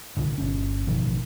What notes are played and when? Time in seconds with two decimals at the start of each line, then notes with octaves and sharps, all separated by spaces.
0.17 C2 A#2 D3
0.38 G1 C#4
0.87 A1 B2 D#3 F3